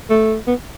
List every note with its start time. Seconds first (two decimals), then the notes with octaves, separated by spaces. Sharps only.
0.10 A3
0.47 B3